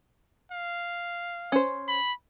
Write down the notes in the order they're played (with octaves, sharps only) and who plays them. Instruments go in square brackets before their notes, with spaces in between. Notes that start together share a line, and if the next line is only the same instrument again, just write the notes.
[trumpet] F5
[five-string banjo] C#4 C5
[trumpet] B5